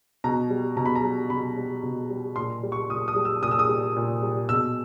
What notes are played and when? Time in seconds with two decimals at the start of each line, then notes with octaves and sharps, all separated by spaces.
0.24 B2 A#5
0.50 G3
0.77 B2 A#5
0.86 B5
0.95 A#5
1.03 G3
1.30 B2 B5
1.57 G3
1.83 B2
2.10 G3
2.36 A#2 C6
2.63 G3
2.72 C#6
2.89 A#2 D#6
3.08 D#6
3.16 G3
3.25 E6
3.42 A#2 D#6
3.51 E6
3.59 D#6
3.69 G3
3.97 A#2
4.22 G3
4.49 B2 E6